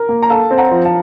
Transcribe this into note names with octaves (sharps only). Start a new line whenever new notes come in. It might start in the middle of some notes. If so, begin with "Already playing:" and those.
Already playing: A#4
A#3
A#5
A4 F5 A5
C4
F#5 A#5
F3
F5 A5